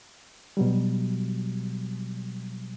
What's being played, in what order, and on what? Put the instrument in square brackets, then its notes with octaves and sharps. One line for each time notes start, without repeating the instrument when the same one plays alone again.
[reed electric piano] B2 F#3 G3